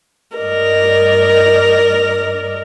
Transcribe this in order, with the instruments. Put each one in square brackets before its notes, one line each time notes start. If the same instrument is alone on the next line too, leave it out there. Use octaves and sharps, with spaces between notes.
[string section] G2 D5 D#5 [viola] A#4